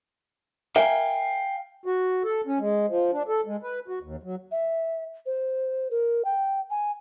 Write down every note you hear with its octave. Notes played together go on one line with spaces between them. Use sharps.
A#4 E5 F5 G5 G#5
F#4
A4
C#4
G#3
F3
D4
A4
G#3
B4
F#4
D#2
F#3
E5
C5
A#4
G5
G#5